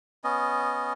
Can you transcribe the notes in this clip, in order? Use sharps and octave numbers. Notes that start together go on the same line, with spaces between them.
B3 C#4 D#5